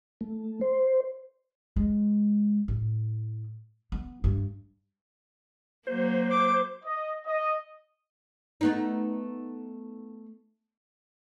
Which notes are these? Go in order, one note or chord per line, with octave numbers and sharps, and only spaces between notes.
A3
C5
G#3
A2
B3
G2
F#3 A#3 C5
D6
D#5
D#5
A3 B3 D#4